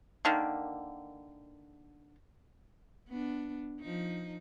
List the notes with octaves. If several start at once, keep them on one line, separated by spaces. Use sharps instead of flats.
D3 D#3 A#3
B3 D4
F3 D#4